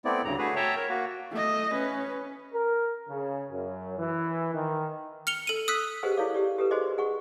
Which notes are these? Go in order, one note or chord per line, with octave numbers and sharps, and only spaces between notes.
A3 B3 C4 E4 D5
D2 G2 C#3 A#5
A3 F#4 G#4 B4
C#5 E5 G5 A5 A#5
A#4
A#3 F#4
A3 D#5
C#4 B4
A#4
C#3
F#2
E3
D#3
F6 C#7 F7 G7
A4 D#7
D#6 E6 F#6 B6
G4 G#4 B4 C5 D#5 F#5
E4 A4 C#5 D5 F5 D6
G4 D5
G4 A4 B4
F#4 G#4 C5 D5 D#5 D6
G#4 F#5 C#6